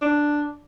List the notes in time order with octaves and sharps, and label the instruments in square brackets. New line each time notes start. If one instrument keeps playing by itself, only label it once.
[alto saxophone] D4